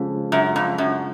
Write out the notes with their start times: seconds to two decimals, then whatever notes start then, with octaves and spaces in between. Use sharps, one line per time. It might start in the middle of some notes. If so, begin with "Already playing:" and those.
Already playing: F2 C#3 G#3 C#4 F4 G#4
0.32 F#2
0.56 F2
0.78 F#2